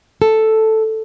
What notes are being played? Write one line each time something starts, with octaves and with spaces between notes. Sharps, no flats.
A4